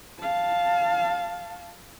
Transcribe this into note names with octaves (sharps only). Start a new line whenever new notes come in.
F5 A5